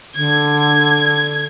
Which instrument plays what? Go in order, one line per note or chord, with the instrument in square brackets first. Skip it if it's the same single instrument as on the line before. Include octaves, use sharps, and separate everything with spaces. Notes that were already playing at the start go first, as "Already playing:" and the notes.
[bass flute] D3 [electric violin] G#6